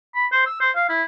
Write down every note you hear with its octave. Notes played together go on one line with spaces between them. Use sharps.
B5
C5
E6
C5
F5
E4